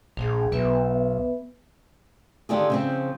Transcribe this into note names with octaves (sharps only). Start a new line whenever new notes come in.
A#1 D4 G#4
B1 B3 B4 E5
D3 D#3 D4 F4 G4 G#4
C#3 F3 C4